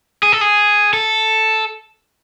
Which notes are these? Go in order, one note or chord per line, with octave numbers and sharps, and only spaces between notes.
G#4
A4
G#4
A4